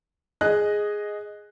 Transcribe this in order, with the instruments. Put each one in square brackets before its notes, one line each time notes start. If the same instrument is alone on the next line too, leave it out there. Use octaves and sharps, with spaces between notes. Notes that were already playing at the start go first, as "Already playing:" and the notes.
[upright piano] G#4 D#5 F#6